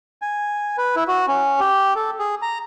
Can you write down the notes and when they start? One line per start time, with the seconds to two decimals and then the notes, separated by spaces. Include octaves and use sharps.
0.22 G#5
0.78 B4
0.96 E4
1.08 F#4
1.28 C#4
1.60 G4
1.96 A4
2.19 G#4
2.42 A#5